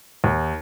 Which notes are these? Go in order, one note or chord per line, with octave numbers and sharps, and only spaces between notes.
D#2